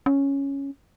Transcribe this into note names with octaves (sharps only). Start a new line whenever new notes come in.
C#4